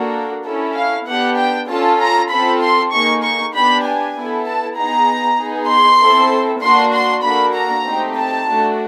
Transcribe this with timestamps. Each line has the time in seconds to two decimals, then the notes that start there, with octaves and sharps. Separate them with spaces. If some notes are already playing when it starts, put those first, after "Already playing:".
Already playing: A#3 D4 F#4 A4
0.45 C#4 E4 A4
0.76 F5
1.07 B3 D4 G4 F#5
1.37 G5
1.69 C#4 F4 A4 A5
2.00 A#5
2.30 C4 F4 A4 B5
2.61 C6
2.92 A#3 D#4 G#4 C#6
3.24 C#6
3.54 B3 D4 G4 B5
3.85 G#5
4.16 B3 E4 A4
4.46 A5
4.77 B3 D#4 G#4 A#5
5.39 B3 D#4 G#4
5.70 C6
6.00 C4 E4 A4
6.63 A#3 D4 F#4 C6
6.94 C6
7.23 A#3 D4 F#4 A4 B5
7.55 A#5
7.85 A3 C4 D#4 G4
8.16 A5
8.47 A3 D4 F#4